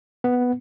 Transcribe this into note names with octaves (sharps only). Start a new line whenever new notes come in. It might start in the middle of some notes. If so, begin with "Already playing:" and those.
B3